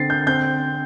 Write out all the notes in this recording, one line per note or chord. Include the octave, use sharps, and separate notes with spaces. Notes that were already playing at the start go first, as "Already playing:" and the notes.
Already playing: D3 C4 A6 C7
G6
C4 G6